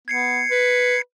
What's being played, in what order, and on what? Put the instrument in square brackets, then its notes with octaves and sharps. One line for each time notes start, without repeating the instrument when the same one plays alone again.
[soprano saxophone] B3 [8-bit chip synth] G#6 C7 C#7
[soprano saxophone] B4